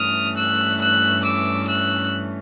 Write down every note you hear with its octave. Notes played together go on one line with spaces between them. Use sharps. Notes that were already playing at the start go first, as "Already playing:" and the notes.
Already playing: G2 E3 A3 C#4 D#6 F6
E6 F#6
E6 F#6
D6 E6
E6 F#6